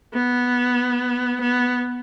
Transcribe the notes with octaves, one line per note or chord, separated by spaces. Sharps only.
B3
B3